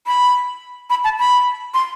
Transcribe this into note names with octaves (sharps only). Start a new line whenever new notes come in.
B5
B5
A5
B5
C6